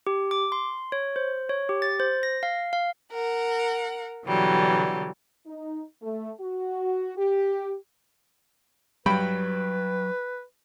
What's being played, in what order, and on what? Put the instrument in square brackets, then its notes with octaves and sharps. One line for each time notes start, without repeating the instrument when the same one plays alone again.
[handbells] G4
D6
C6
C#5
C5
C#5
G4
A6
C5
A#6
F5
F5
[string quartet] A#4 F#5
B2 D3 E3 F#3 G3
[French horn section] D#4
A3
F#4
G4
[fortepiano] G2 G5 B5 [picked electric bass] F#3 [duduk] B4